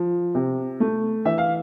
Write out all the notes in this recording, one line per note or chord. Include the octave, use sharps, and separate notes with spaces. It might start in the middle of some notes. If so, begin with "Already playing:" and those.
Already playing: F3
C3
A3
E3 E5
F5